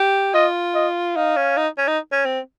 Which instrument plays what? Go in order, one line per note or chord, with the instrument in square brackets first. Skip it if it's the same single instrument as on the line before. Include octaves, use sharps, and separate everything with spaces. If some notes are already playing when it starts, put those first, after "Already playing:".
Already playing: [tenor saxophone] G4
[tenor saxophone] F4 [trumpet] D#5
[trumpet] D#5
[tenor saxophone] D#4 [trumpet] F5
[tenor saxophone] C#4
D#4
C#4
D#4
C#4
C4